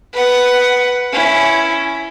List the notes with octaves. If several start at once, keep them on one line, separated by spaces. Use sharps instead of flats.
B4 F#5
C#4 E4